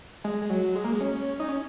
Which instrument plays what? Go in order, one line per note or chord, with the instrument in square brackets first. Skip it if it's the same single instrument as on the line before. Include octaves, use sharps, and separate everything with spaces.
[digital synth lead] G#3
G#3
F#3
G#3
A#3
G#3
C#4
D#4
C#4